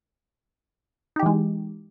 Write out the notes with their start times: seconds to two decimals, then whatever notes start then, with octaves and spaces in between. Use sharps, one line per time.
1.16 D#4
1.19 G4
1.23 E3
1.26 G#3